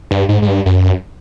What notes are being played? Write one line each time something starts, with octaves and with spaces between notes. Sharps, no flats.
G2
G#2
G#2
G2
F#2